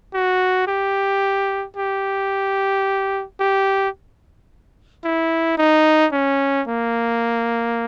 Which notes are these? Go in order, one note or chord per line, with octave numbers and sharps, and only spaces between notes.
F#4
G4
G4
G4
E4
D#4
C#4
A#3